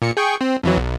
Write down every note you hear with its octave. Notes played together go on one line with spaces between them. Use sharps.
A#2 C#7
G#4 G5 C#6
C4
F2 E3 F#3
B1